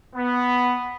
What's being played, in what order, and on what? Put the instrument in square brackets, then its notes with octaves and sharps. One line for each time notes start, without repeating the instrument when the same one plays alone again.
[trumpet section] B3